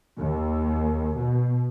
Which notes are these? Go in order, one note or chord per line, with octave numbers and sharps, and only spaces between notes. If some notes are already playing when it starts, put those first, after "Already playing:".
D#2
B2